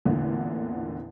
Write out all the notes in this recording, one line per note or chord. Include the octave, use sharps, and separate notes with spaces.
A1 E2 A#2 D3